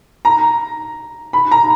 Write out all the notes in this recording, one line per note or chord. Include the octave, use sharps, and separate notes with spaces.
A#5
B5
A#5